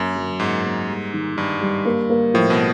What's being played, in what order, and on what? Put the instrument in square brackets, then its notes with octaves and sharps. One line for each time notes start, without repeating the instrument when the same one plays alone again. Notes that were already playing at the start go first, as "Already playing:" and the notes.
Already playing: [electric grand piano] F#2 [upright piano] A#3
[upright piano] F#3
[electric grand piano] G#2 [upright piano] A#3
[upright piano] A#3
G3
D#3
[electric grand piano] G2 [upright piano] D#3
[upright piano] G3
A#3
A#3
[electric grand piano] A2 [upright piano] F3
[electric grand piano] B2